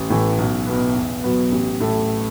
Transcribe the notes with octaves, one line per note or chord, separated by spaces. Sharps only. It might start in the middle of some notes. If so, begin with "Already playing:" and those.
Already playing: A1
A2 E3
B1
B2 B3
E2
B2 F#3 B3
A1
A2 A3